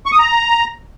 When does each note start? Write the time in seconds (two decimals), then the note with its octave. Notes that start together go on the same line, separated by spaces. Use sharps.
0.06 C#6
0.12 D#6
0.19 A#5